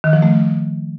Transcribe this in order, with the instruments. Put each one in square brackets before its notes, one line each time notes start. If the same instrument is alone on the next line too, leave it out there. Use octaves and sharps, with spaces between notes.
[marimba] D#3
F3
A3